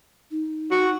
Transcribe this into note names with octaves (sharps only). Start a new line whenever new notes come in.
D#4
F#4